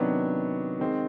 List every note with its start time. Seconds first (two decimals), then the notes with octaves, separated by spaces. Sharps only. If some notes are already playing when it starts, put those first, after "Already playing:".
Already playing: C3 D#3 F#3 B3 D4
0.80 D#3 G#3 C4